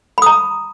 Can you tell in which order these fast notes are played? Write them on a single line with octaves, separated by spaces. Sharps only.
B5 D#6 A#5